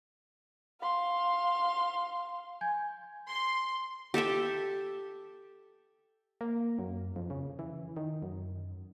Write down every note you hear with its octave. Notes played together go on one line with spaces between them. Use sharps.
F5 C6
G#5 G6 G#6
C6
G4 A4 E5 G5
A#3
F#2
F2
C#3
E3
D#3
F#2